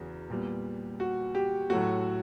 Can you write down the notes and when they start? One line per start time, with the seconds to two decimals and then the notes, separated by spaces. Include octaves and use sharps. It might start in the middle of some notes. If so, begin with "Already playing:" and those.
Already playing: E2 C#3 F#3
0.30 A#2 G3 B3
1.00 F#4
1.35 G4
1.70 A2 F#3 A3 F#4